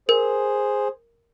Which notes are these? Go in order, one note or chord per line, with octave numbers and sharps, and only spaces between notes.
G#4 A#4 C5